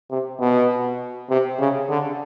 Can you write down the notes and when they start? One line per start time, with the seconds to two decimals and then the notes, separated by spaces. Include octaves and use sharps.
0.11 C3
0.40 B2
1.30 C3
1.59 C#3
1.89 D3